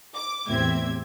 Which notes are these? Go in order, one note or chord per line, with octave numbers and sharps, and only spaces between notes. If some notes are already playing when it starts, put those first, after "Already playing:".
D6
E2 A2 C4 G4 E5 G#6